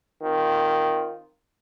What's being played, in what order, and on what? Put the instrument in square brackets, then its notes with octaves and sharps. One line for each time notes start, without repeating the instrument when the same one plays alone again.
[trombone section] D#3 C4 F4